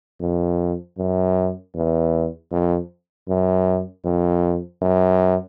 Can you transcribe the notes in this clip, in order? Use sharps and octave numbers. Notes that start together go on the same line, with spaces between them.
F2
F#2
E2
F2
F#2
F2
F#2